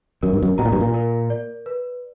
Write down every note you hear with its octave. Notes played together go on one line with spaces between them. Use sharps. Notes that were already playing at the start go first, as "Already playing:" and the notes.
F#2 A#4
G2
F#2
B2 A#5
A#2
G2
A#2
A#4
D5
B4